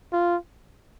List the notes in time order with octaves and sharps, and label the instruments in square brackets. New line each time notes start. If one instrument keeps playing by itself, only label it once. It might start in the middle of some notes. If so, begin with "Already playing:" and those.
[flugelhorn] F4